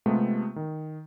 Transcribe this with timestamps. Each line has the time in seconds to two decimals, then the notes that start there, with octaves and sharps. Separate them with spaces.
0.06 C3 G#3 A3 B3 F4 G4
0.56 D#3